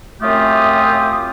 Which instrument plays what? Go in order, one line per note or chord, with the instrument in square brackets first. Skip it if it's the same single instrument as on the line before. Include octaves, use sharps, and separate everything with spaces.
[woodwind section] F#2 A3 C4 F4 G4 D#6